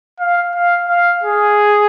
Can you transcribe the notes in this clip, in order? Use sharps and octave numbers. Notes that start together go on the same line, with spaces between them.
F5
F5
F5
G#4